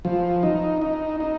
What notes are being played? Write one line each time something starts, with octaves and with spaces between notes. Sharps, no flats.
F3
D#4
D#4
D#4